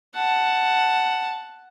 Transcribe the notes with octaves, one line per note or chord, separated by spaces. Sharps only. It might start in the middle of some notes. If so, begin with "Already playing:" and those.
F#5 A5